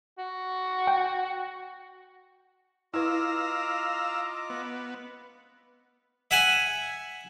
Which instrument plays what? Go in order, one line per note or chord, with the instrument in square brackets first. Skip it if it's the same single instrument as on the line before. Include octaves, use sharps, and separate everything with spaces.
[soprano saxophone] F#4
[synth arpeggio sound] G5
[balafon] E4 B4 [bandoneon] F4 D#5 D6 [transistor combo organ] F5 A#5 E6
[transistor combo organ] B3
[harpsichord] E5 F#5 G#5